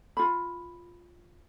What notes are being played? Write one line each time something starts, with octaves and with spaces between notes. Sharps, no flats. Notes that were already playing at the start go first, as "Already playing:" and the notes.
F4 B5